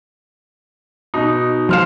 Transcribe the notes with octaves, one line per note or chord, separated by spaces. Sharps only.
B2 D#4
F3 F5 C6 F6 E7